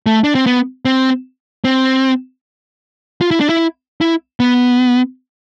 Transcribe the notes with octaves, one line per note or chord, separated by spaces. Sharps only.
A3
D4
C4
B3
C4
C4
F4
E4
D4
E4
E4
B3